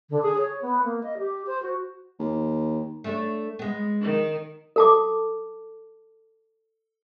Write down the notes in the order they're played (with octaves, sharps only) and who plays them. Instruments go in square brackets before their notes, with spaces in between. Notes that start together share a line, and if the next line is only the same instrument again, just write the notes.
[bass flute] D3
G#4
C#5
B3
A#3
D#5
G4
C5
F#4
[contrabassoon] D#2
[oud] A3 D4 A4
G#3 B3
[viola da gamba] D#3
[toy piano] A4 A5 D6